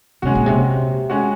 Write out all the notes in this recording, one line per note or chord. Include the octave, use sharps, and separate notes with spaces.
C3 G#3 C#4 F#4
A#2
C3
G#3 C#4 F#4